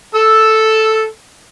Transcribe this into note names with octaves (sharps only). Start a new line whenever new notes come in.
A4 E6